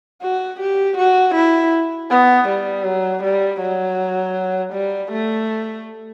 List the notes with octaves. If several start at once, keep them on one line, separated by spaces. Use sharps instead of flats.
F#4
G4
F#4
E4
B3
G3
F#3
G3
F#3
G3
A3